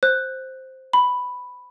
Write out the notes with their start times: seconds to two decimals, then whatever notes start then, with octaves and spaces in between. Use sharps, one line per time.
0.03 C5 F#6
0.93 B5